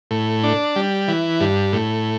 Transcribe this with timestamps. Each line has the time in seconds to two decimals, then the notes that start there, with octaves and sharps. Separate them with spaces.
0.11 A2
0.44 D4
0.76 G3
1.08 E3
1.41 G2
1.73 A2